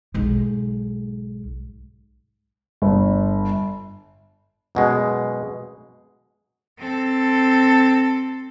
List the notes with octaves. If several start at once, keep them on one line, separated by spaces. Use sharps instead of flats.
B1 G#2
G1
F#2 B2 G#3
C4 A4